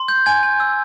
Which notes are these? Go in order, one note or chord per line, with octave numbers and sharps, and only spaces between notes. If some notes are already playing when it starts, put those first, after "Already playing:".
Already playing: C6
G6
G#5 G#6
G#5
E6